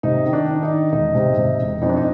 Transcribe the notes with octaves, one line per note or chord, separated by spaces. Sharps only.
C3 D#4
D#3
D4
D#3
D#4
D#3
E1 D#4
C3
C3
E1
F2 D#4
D4
D#4